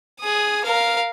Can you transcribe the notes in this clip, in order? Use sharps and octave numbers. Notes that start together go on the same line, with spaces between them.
G#4 D#6
A#4 F5